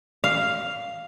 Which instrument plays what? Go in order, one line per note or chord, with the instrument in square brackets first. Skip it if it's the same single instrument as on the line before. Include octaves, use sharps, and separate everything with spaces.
[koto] F5